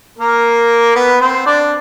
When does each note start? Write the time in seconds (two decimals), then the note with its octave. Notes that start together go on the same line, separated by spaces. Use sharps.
0.18 A#3 A#4
0.95 B3 B4
1.21 C4 C5
1.46 D4 D5